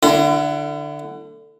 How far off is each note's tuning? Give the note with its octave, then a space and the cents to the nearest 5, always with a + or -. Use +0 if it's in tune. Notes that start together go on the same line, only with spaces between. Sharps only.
D3 +15 E4 +40